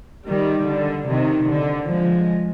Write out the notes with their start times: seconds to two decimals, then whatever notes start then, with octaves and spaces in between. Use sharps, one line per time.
0.27 D#3 G3
0.68 D3
1.09 C3 D#3
1.49 D3
1.91 F3 G#3